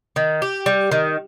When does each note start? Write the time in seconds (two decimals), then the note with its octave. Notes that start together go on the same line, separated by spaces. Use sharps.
0.16 D#3
0.42 G4
0.66 G3
0.91 D#3